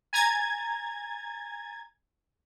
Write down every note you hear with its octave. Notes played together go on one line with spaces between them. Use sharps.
G#5 A#5 G#6 A6